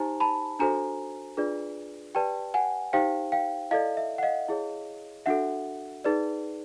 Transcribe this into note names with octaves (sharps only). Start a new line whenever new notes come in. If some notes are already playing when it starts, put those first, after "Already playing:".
Already playing: D#4 G4 C5 G#5 A#5
A5 B5
D4 F#4 A4 C5 G#5 A#5
D4 F4 G#4 B4 D5
G4 B4 D5 G5 A5
F#5 G#5
D#4 G4 C5 F5 G5
F5 G5
E4 A4 D5 D#5 F5
E5
F#5
D#5 F5
E4 G#4 C#5
D4 F#4 A4 E5 F#5
D#4 G#4 B4 D5